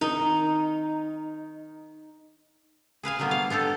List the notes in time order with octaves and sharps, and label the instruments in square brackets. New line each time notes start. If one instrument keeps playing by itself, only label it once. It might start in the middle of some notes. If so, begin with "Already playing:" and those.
[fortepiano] D#3 [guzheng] D#4
[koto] G#4 B4 F5 G#5
D3 F#3 G3 A#3 B3
F5
B3 D4 G4 A4